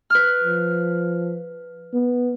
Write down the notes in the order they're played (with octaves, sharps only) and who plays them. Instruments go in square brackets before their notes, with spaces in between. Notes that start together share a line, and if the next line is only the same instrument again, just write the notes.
[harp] B4 F6
[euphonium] F3
B3